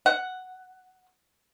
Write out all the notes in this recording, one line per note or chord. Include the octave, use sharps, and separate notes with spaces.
F#5